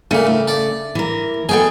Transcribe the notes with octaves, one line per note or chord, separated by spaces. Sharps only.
A#2 C#3 A3 A#3
A2
A4 D5
E3 A#4
B2 G#4 A4 G5 G#5